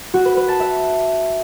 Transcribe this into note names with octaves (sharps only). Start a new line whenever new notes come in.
F#4
B4
B4
A5
E5